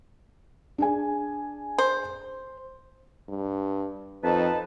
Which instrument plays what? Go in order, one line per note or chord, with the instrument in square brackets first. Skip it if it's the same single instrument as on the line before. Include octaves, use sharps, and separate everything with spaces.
[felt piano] D4 G#4 G#5
[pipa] C5
[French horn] G2
[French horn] F2 [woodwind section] D#4 B4 A5